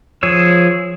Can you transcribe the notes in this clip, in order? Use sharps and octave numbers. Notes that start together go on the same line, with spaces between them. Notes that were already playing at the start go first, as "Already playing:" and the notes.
F3 G#4 C#5 E6